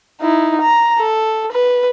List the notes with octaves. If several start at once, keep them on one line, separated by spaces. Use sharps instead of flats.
D#4 E4
A#5
A4
B4